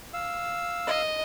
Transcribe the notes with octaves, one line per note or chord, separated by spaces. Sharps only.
F5 E6
D#5